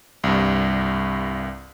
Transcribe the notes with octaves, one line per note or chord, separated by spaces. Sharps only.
C2 G2